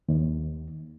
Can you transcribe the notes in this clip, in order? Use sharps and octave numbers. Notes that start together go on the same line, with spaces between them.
D#2